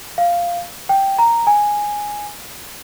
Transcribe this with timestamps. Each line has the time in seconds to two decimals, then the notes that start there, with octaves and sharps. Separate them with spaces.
0.18 F5
0.89 G5
1.19 A#5
1.47 G#5